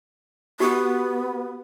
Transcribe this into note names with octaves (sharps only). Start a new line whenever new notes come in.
B3 F#4 G4